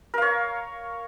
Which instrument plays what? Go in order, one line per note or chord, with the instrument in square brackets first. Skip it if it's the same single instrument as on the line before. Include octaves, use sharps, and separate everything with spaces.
[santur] A#4
F5
C#5